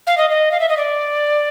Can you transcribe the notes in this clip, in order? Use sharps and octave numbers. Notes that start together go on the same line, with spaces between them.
F5
D#5
D#5
F5
E5
D#5
D5